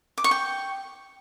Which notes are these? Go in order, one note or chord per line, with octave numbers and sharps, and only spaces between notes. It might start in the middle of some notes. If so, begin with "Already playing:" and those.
D6
C#6
G5